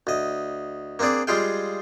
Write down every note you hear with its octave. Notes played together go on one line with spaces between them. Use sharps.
D2 D#5
A#3 C4 D4 G#4 D5
G3 G#3 F4 G#4 F5 G5